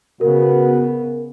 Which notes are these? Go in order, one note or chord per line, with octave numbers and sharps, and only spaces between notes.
C#3 B3 F#4 A#4